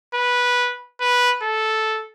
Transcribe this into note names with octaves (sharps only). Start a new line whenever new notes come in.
B4
B4
A4